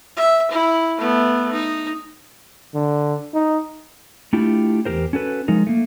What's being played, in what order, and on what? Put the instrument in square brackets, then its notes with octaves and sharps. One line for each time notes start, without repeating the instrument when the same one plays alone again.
[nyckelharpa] E5
E4
A3 B3
D#4
[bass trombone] D3
D#4
[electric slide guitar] A3 D4 E4 F4 G4
E2 G2 G4 A#4 C5
C#4 F#4 A4 B4
F3 G#3 D#4 A#4
A3 A#3